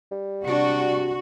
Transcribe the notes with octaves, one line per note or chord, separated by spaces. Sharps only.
G3
C3 D4 F#4